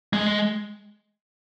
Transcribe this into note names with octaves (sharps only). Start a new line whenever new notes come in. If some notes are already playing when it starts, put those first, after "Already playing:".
G#3